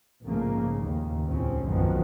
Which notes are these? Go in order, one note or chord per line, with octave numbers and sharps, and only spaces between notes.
A#1 G#2 C#3 A3 A#3
D#2
C#2 A2 C4 C#4
B1 F#2 D3 D#3 F3 B3